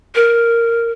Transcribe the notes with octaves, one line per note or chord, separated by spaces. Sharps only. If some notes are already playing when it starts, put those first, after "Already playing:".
A#4